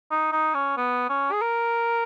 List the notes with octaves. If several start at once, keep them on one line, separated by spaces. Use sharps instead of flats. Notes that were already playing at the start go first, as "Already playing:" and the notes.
D#4
D#4
C#4
B3
C#4
G#4
A#4